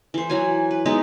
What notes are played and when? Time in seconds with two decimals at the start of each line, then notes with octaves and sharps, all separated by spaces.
0.14 E3 C5
0.30 E3 F#3 G#5
0.71 B4
0.85 G#3 B3 D#4 E4